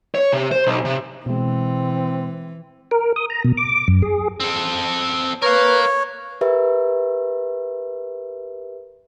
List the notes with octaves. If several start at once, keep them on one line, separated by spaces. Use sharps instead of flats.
C#5
C3
C5
B1
C3
B2 E3 G#3 C4
A#4
D#6
A#5
B2
D6
F#2
G#4
C4 A4
A#4 B4 C#5 F5
G4 A#4 B4 E5